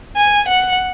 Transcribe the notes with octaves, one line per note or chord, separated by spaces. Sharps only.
G#5
F#5